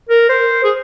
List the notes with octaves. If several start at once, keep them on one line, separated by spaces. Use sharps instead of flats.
A#4
C5
G#4